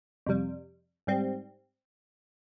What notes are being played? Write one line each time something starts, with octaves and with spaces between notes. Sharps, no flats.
F2 C3 G3
G#2 G3 C4